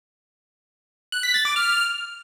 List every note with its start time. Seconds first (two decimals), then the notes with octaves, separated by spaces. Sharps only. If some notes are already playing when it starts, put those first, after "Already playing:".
1.12 F#6
1.23 B6
1.34 A6
1.45 D6
1.56 F6